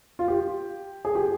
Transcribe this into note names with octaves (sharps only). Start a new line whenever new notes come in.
F4
G4
G#4
G4